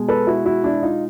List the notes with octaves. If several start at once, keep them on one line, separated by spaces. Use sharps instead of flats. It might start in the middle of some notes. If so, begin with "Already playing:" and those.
Already playing: B2 G#3
A4 B4
E4 F#4
E4 F#4
D4 E4
D#4 F4